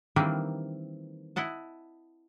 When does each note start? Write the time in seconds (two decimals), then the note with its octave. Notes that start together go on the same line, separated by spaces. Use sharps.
0.16 D#3 E3 G3 A#3 C4 D4
1.36 E4 D#5 F#5 A5